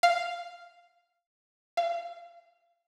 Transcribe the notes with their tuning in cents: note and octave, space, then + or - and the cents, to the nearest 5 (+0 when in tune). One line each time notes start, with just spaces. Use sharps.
F5 -5
F5 -25